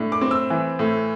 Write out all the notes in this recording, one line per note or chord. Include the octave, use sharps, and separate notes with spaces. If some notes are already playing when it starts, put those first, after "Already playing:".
Already playing: A2 D4
D6
C4
E6
E3
A2